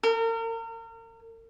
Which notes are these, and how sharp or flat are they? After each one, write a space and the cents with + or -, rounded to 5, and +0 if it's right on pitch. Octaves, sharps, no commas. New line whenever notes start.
A#4 -35